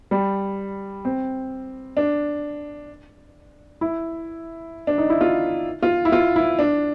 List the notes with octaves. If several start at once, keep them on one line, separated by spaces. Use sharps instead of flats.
G3
C4
D4
E4
D4
D#4
E4
F4
F4
E4
F4
E4
D4